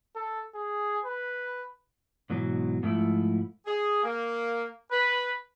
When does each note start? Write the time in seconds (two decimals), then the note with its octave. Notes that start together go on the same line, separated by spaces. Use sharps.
0.16 A4
0.55 G#4
1.04 B4
2.30 G#2 B2 E3 F#3
2.83 G#2 F3 A3 E4
3.66 G#4
4.03 A#3
4.91 B4